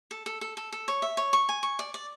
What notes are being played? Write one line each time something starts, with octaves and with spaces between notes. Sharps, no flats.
A4
A4
A4
A4
A4
C#5
E5
C#5
C#6
G#5
C#6
D5
D5